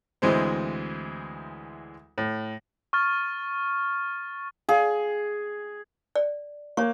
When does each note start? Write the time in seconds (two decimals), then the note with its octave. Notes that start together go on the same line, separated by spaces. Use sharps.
0.22 D2 E3 G#3 C4
2.18 A2
2.93 C#6 F6 A6
4.69 G#4 D5 F5
6.16 D5
6.77 A#3 C#5 C#6